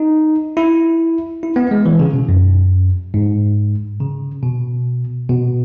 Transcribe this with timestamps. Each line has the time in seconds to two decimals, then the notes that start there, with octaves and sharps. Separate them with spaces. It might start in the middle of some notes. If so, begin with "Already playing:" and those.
Already playing: D#4
0.57 E4
1.43 E4
1.56 B3
1.71 G#3
1.86 E3
1.99 C#3
2.14 B2
2.29 F#2
3.14 G#2
4.00 C#3
4.43 B2
5.29 B2